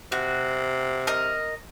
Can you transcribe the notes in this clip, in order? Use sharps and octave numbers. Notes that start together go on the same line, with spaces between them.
C3 F#4
A#4 D#5